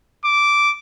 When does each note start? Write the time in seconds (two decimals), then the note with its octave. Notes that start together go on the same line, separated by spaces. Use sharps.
0.25 D6